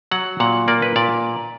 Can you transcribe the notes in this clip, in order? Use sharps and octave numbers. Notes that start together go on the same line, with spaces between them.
F#3 F#5
A#2 F#5
A#3 D5
B4
A#2 D5